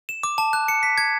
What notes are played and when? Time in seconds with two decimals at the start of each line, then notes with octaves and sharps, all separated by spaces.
0.09 E7
0.23 D6
0.38 A5
0.53 F#6
0.68 C#7
0.83 B6
0.98 G#6